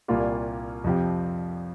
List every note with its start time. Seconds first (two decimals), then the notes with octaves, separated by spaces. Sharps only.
0.08 C2 A#2 G3 A#3 F4
0.84 F2 C3 F3 C4 G4